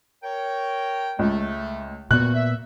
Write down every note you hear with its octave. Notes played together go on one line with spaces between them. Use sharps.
A#4 C#5 G5
C#2 A3
D2 A#2 B3 F#4 F#6
E5